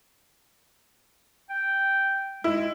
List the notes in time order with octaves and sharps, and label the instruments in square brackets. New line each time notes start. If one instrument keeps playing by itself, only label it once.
[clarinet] G5
[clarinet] G#3 [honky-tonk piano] E4